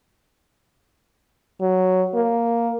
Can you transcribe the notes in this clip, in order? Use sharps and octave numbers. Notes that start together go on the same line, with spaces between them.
F#3
A#3